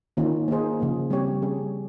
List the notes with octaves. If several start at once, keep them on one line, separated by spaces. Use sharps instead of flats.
D#3 A#3 C#4 F4
A#3 D#4 G#4 C5
C#3 F3 A#3
G3 C4 G4 C#5
G3 C#4 G#4